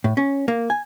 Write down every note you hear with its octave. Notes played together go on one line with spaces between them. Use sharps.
A2
C#4
A#3
G#5